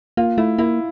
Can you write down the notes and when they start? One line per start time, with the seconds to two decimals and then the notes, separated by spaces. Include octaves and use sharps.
0.17 A#3 F4
0.38 A3 E4
0.58 A#3 E4